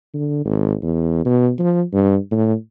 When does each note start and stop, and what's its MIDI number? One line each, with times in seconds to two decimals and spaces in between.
0.14 0.42 50
0.45 0.75 32
0.83 1.21 40
1.25 1.51 47
1.59 1.83 53
1.93 2.17 43
2.31 2.54 45